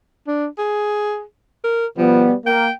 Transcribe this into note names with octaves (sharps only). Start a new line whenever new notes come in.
D4
G#4
A#4
B2 F3 G3 B3
A#3 G5